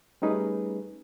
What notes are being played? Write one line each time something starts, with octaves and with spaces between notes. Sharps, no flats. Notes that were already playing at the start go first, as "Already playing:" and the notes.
G3 A3 C#4 D#4 G#4 B4